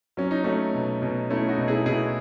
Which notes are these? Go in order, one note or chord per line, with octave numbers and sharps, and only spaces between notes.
F#3 C#4
D#4
F#3 A3 C#4
B2
B2
A3 C#4 E4
D#4 F#4
B2
E4 G#4
B2 E4 G#4